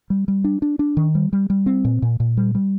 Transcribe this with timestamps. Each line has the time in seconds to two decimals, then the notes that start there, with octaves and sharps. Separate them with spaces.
0.10 G3
0.28 G3
0.44 D4
0.62 D4
0.79 D4
0.97 D#3
1.15 G3
1.33 G3
1.50 G3
1.66 C4
1.85 A#2
2.02 A#2
2.20 A#2
2.37 G3
2.55 G3